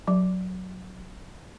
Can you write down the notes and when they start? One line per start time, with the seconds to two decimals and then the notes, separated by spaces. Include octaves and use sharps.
0.08 F#3